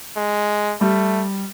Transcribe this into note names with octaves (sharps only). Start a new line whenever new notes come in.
G#3
G3 A3